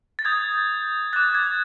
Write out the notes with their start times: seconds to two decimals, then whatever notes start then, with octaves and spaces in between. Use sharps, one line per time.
0.19 A6
0.25 D#6 G6 G#6
1.13 D6 F#6 A6
1.35 G#6